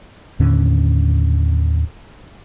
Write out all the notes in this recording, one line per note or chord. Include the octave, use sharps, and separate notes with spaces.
D#2 A2 D3 C#4